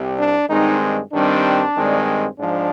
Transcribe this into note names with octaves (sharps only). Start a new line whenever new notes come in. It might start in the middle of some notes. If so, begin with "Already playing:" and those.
Already playing: C2 C3 G3
D4
G2 D#3 G#3 C4 D#4
G2 D#3 G3 C4 D4
G2 D#3 G#3 C4
G#2 F3 D4